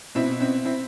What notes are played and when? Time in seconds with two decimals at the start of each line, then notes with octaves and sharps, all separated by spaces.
0.15 B2 C4 E4
0.40 C4 E4
0.65 C4 E4